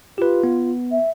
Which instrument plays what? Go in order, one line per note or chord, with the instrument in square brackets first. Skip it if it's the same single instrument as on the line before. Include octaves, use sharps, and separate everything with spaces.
[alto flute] F4 [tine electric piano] G4 B4
[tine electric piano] B3
[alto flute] E5